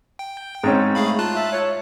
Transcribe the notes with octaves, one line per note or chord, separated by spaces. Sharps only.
G5
G#2 C4 C#4
A3 G#4 F5 B5
F4 A5 F#6
E5
C#5